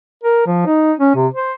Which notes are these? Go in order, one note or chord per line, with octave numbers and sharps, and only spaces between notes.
A#4
F3
D#4
C#4
C3
C5